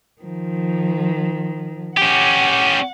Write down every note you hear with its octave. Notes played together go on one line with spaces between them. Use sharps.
D#3 F3
C#4 G4 F#5